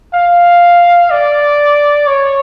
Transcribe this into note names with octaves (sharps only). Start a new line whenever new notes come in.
F5
D5
C#5